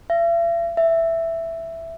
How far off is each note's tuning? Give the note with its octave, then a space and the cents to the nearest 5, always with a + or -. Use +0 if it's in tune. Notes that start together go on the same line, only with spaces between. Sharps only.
E5 +45
E5 +5